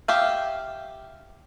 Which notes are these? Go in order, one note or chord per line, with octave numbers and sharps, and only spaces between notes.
G4 E5 F5